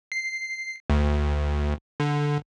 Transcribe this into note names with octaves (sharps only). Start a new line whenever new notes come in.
C7
D2
D3